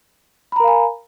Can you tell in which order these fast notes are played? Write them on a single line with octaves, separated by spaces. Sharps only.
B5 A#5 A#4 F5 G#5